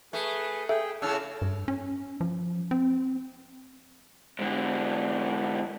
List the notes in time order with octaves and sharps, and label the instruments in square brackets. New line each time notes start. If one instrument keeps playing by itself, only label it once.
[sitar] A3 [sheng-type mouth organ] G#4 B4
[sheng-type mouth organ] G#4 G5 [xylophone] A4 [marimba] E5
[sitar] A2 C#3 [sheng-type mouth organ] A5 E6 F6
[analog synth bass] G2
C#4
F3
C4
[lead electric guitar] G#2 D3